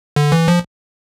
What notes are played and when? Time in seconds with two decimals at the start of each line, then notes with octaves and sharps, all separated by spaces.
0.16 D3
0.32 E3
0.48 F3